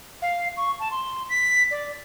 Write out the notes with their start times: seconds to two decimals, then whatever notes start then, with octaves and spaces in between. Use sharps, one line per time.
0.22 F5
0.57 C#6
0.80 A5
0.91 C6
1.30 B6
1.71 D5